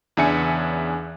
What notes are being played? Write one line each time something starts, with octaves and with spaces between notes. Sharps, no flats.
E2 C#3 D4 E5 G#5 C#7